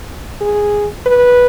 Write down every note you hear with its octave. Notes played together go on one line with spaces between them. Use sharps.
G#4
B4